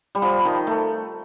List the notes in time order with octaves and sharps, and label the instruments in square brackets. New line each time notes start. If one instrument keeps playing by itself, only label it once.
[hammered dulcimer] G3
F3
D#3
A3